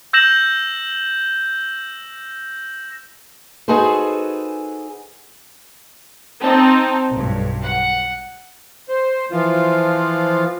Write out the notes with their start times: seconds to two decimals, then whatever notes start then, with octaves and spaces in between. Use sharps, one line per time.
0.13 E6 G6 A#6 E7 F#7
3.68 D#4 F#4 G#4 A4 B4 C5
6.42 C4 D#4 A5
7.11 B1 G2
7.65 F#5
8.89 C5
9.32 E3 F3 F4